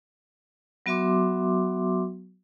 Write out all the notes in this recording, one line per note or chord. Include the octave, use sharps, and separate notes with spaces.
F#3 B3 F#4 E5 C6 D6